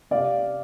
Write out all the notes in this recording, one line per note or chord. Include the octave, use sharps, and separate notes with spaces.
C3 D5 F5